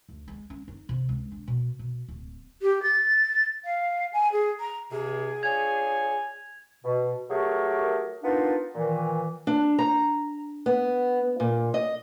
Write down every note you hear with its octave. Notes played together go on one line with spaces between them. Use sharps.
D2
G#3
C#4
D#4
C3
C#2
D4
B2
B2
D1
G4
A6
F5
G#5
G#4
A#5
C#2 C3 G#4
D4 F4 C#5 G#5 G#6 F7
B2
F#3 A3 G4 G#4 A#4
A#3 B3 D4 D#4 F4
A#2 D#3 E3
D4
A#5
B3
A#2
D#5